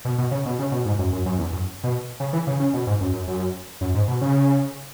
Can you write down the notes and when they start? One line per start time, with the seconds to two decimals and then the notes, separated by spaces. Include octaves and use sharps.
0.05 B2
0.18 B2
0.31 C#3
0.46 B2
0.59 C#3
0.72 B2
0.85 G#2
0.99 F#2
1.13 F#2
1.26 F#2
1.39 E2
1.52 F#2
1.84 B2
2.20 C#3
2.33 E3
2.47 C#3
2.60 C#3
2.74 B2
2.87 G#2
3.01 F#2
3.13 F#2
3.27 F#2
3.81 F#2
3.94 G#2
4.08 B2
4.21 C#3